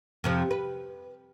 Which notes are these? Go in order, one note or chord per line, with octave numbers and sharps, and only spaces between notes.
F2 C3 F3
B4